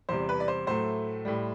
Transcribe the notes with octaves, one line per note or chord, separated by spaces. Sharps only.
E2 C3 G3 C5
B4
D5
C5
A2 F#3 A3 C5
A2 G3